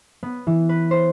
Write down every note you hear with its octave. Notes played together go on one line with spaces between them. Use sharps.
B3
E3
B4
C5